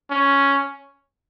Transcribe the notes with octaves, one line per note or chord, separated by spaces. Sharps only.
C#4